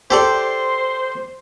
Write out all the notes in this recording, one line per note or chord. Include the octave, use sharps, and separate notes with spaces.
G4 A4 C5 D5